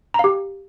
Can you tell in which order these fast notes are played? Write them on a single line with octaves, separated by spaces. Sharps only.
A#5 F5 G4